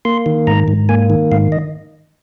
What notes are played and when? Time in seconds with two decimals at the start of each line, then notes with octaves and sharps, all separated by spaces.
0.05 A#3 C6
0.26 D#3
0.47 G#2 A#5
0.68 G#2
0.89 A#3 G#5
1.10 D#3
1.32 G#2 F5
1.52 D#5